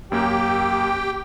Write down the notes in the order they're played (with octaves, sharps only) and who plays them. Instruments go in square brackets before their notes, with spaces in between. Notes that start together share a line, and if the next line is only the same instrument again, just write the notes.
[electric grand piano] F#2 A#3 [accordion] G4 G5